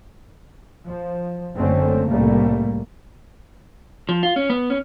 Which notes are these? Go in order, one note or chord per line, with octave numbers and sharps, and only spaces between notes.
F3
F#1 D3 A3 C4 C#4
C2 A2 C#3 G3 A3 A#3
F3
F4
C#4
B3
C#4